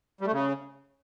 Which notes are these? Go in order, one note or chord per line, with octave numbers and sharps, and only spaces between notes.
G3
A3
C#3